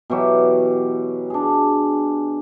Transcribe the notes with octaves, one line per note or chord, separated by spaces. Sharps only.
B2 E3 F#3 G4
D4 G#4